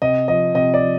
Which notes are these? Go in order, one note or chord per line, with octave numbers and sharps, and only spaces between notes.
C3 D#5
F3 D#5
C3 D#5
D5
F3